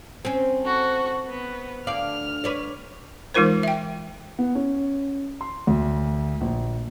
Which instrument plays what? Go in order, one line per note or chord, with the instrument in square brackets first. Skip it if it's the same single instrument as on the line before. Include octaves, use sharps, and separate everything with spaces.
[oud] C4 C#4
[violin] F#4 A4
B3
[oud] D2 D5 F5 [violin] F6
[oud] B4 C#5 D5
[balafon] E3 G#3 D#4 F4 A#4 C5
E5 G5
[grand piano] B3
C#4
C6
D2
A#1